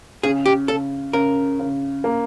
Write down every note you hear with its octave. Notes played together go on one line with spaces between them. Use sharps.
C#3 G#4
G4
C#3 A4
C#3 A#4
C#3
A#3